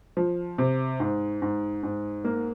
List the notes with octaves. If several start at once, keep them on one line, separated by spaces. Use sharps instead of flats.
F3
C3
G#2
G#2
G#2
A#3